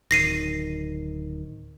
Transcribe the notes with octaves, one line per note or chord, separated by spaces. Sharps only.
D1 D#3 A#6 C7 D#7